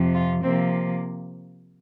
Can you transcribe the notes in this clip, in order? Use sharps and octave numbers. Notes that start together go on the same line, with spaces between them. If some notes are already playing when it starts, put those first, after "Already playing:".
Already playing: F2 C3 F3
F4
C3 F3 A#3 C4